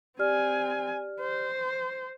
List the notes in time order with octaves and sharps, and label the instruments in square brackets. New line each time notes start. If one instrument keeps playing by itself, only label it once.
[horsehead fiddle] C4 G#5 [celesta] G4 D5 F6
[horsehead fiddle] C5